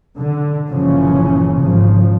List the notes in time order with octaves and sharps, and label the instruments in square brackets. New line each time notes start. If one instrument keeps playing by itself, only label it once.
[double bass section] D3
G1 A#2 C#3 E3 F3 C#4
G#1 C#3 F3